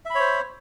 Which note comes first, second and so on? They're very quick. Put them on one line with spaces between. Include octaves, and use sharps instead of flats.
E5 B5 C#5 C5